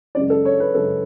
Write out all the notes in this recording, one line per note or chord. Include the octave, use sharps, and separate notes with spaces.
F#2 C#3 G#3 D5
A4
C#5
B4
F#2 C#3 G#3 A4